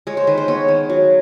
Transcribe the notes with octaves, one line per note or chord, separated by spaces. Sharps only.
G#3 C#5
C5
D#3 B4
C5
B3 C#5
D#3
F#3